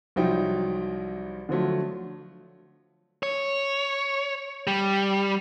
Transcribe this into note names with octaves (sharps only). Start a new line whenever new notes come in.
C2 F3 F#3 D#4 E4 G5
D3 F3 F#3 A3
C#5
G3